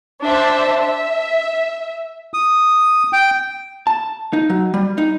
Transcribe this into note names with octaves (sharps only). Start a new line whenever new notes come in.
D4 C5 E5 A5
E5
D#6
G5
A5
D#4
F#3
G3
D#4